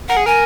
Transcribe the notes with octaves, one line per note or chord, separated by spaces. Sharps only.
A#4 F#5
G#4
A#4 G#5